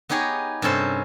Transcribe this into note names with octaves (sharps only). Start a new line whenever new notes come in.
B3 D#4 G4 G#4 C#5 D#5
G2 C3 C#4 A4 C5